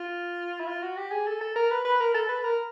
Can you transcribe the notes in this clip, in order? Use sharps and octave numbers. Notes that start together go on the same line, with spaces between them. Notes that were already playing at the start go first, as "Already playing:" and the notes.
Already playing: F4
E4
F4
F#4
G4
G#4
A4
A4
A#4
B4
B4
A#4
A4
B4
A#4